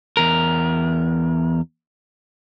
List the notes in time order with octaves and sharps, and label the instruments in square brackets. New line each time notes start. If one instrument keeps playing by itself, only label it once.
[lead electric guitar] E2 A#4